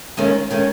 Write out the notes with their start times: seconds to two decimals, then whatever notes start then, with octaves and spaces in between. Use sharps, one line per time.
0.17 D#2 D#3 G#3 C#4
0.51 D#3 G#3 C#4